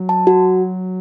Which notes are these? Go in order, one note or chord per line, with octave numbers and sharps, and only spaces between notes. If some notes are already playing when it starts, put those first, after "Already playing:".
Already playing: F#3
A5
F#4